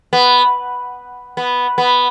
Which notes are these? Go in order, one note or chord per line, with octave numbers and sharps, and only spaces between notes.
B3
B3
B3